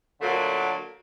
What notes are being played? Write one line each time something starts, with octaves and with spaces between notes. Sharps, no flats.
A#2 D3 F#3 A3 A#3